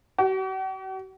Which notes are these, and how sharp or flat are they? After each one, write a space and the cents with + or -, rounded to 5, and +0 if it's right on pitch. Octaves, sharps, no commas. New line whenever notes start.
F#4 +45